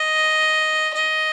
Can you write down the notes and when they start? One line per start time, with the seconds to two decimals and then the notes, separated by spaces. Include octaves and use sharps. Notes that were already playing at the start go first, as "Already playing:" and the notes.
Already playing: D#5
0.95 D#5